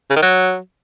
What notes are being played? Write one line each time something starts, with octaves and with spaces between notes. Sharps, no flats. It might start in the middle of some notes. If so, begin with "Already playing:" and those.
C#3
D#3
F#3